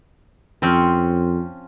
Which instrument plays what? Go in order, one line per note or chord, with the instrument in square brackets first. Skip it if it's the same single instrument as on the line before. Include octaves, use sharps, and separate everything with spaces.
[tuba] F2 [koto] F3 C4 C#4